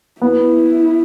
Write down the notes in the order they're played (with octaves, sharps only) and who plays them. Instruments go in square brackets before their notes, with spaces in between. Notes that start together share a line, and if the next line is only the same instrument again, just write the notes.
[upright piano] B3 [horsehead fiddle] E4